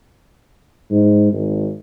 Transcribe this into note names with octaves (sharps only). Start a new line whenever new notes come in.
G#2
G#1